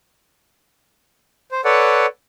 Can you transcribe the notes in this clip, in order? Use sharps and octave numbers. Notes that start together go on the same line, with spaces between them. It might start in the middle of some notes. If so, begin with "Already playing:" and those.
C5
A4 B4 C#5 D5 F#5